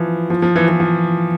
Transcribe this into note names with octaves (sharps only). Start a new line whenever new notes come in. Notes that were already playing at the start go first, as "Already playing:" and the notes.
Already playing: E3 F3
F3
F3
E3
E3
F3